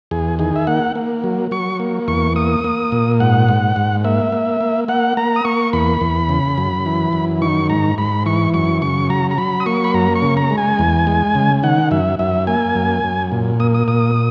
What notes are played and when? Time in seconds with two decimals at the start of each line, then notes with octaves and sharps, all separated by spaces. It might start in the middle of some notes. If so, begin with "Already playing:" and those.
0.11 E2 G#4
0.39 D#3 G#4
0.56 E5
0.67 A#3 F#5
0.95 A#3
1.24 F#3
1.51 F#3 C#6
1.80 A#3
2.08 E2 C#6
2.36 A#3 D#6
2.64 A#3
2.92 A#2
3.20 G#2 F#5
3.49 G#2
3.76 G#2
4.04 A#3 E5
4.32 A#3
4.61 A#3
4.88 A#3 F#5
5.17 A#3 A#5
5.36 D#6
5.45 A#3 C#6
5.73 E2 B5
6.01 E2
6.29 C#3
6.58 F#2
6.86 E3
7.13 F#2
7.42 D#3 C#6
7.70 G#2 A#5
7.98 G#2 B5
8.26 E3 C#6
8.54 F#2 C#6
8.82 C#3 C#6
9.10 F#3 A#5
9.31 A#5
9.38 F#3 B5
9.60 D#6
9.66 A#3 C#6
9.84 B5
9.94 F#2 A#5
10.15 C#6
10.22 C#3
10.37 A#5
10.50 G#3
10.58 G#5
10.79 E2
11.07 G#3
11.35 C#3
11.63 D#3 F#5
11.91 F#2 E5
12.19 F#2 E5
12.47 A#3 G#5
12.75 F#2
13.04 F#2
13.32 A#2
13.60 A#3 D#6
13.74 D#6
13.88 A#2 D#6